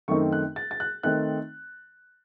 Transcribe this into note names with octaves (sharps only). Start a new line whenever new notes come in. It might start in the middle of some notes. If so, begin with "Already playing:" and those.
F#2 D#3 A3 C4 D#4 C#6
F#6
A6
A6
F#6
D#3 A3 C4 D#4 F#6